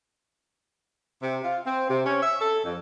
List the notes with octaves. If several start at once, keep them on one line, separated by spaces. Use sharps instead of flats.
C3
F4
C4
C3
C#4
E5
A4
F2